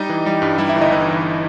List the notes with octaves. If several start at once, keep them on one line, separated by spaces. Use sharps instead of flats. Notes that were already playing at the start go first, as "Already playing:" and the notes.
Already playing: G3 D#4 D#5
E3
G3
G2
G3 E4 E5
E4 E5
G1
D#4 D#5
E3 E4 E5
E3